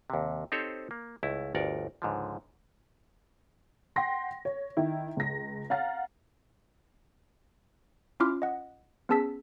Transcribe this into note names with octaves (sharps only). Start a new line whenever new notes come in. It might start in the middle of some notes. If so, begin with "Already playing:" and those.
D#2 C3
C4 D#4 G4 A4 C5 C#5
A#3
C#2 A3 E4
G1 D2 A#4 D5 F#5
C#2 G#2 D3 F3
F#5 G5 C6 A#6
C#5
D#3 E4
C#2 A#6
F5 F#5 A#5 F6 A6
C#4 E4 F4 C6 D6 F6
D#5 F#5
B3 C#4 G#4 A5 E6 B6